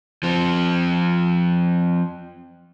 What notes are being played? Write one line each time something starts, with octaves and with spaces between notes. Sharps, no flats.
F3 C4